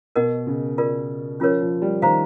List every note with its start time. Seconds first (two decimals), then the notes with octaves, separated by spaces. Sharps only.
0.16 B2 A#4 D#5 F#5
0.47 C#3
0.78 F4 A#4 D5
1.40 F3 C#4 F4 A#4 C#5
1.61 F3
1.82 G3
2.02 D#3 C5 F5 A#5